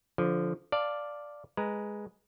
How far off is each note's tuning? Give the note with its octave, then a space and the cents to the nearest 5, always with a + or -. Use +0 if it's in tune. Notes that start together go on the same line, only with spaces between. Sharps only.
D3 -15 F3 +0
D5 +0 F5 +0 A5 +10
G#3 +0 B4 +0 A#5 +0